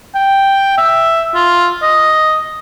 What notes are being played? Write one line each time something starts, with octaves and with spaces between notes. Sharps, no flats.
G5
E5
F4
D#5